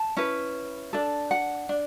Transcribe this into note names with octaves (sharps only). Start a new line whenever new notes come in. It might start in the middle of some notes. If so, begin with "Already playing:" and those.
Already playing: A5
C#4 E4 B4
D4 A4
F#5
D4